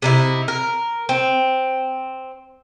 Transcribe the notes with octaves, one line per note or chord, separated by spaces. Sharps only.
C3 D#4 E4
A#4
C4